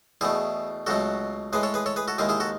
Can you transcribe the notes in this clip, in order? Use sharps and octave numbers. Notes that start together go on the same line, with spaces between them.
E2 B2 A3 E4 G#4
C#2 B2 F#3 A3 F#4 A4
A2 G#3 G#4 B4
A4 C#5
G#4 B4
A4 C#5
G#4 B4
F#4 A4
D#2 D#3 G#3 E4 G#4
E4 G#4
F#4 A4